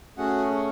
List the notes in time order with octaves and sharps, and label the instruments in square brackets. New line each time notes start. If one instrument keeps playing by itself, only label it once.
[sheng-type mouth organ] A3 C#4 F#4 G#4 F#5